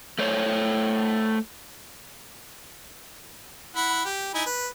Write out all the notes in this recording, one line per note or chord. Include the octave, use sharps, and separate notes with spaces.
A3 C5 C#5
E4 F#5 B5
G4
D#4 E4 G#5
B4